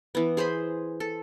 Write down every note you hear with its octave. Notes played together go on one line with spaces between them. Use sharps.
E3 B3
G#4 C5 G#5 B5
A4